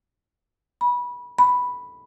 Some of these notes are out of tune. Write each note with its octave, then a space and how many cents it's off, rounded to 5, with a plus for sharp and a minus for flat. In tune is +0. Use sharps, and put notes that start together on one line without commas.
B5 -20
B5 +0